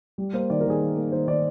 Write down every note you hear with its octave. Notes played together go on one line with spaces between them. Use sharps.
G3
A#3 C5
D#3 D5
A#4
D#3 G#4
A#3
A#3
D#3 C5
D#3 D5